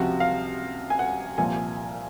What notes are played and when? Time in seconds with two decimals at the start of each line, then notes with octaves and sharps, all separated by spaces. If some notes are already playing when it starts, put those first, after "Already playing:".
Already playing: C#2 C3 F3 F#4
0.20 F5
0.90 G#5
0.99 F#5
1.38 C2 A#2 F3 G#5